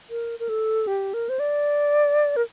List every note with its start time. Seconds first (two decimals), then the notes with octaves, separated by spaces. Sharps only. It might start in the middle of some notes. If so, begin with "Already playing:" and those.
0.10 A#4
0.40 A#4
0.49 A4
0.87 G4
1.14 A#4
1.29 C5
1.39 D5
2.37 A#4